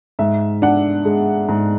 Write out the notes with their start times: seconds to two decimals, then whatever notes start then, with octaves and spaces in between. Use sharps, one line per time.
0.19 G#2 E5
0.62 D4 F#5
1.05 G#3
1.48 G#2